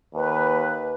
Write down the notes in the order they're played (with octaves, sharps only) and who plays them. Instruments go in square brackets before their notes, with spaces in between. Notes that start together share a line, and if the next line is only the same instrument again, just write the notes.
[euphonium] D#2 [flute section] B4